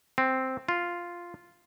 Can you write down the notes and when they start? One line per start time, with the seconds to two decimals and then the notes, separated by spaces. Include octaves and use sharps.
0.18 C4
0.69 F4